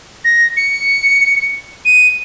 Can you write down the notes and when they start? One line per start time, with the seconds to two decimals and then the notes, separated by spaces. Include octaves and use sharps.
0.25 A#6
0.57 C#7
1.85 D#7